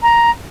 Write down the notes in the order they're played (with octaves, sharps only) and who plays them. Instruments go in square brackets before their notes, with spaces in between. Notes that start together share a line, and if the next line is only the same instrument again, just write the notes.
[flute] A#5